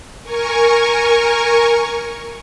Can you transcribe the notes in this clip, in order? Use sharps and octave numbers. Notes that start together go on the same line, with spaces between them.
A#4 G#5 C#6